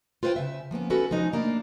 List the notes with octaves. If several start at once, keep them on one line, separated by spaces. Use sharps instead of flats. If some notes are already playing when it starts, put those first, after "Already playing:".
F4 B4 C5 F5 G5
C#3 E5
F3 A#3 B3 C#4
C#4 E4 F#4 A4 B4
F3 G#3 C#4 D#4
A3 A#3 D4 E4